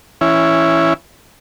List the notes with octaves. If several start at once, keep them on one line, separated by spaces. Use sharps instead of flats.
E3 C#4 E4